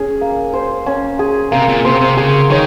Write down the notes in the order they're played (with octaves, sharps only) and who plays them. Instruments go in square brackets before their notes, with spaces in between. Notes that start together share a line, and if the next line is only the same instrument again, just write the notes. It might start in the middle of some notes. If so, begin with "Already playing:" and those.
Already playing: [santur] C#4 G#4
A#3
C5
C#4
G#4
[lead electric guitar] C3 [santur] A#3
[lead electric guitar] A#2
[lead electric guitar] C3 [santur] C5
[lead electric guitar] C3
[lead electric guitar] C#3 [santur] G#4
[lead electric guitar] D#3 [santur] C#5